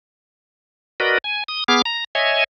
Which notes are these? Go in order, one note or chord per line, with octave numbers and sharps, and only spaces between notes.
F#4 A#4 B4 D5 D#5
G#5
D#6
B3 G#4 D6 F6
A#5
C#5 D#5 E5 G#5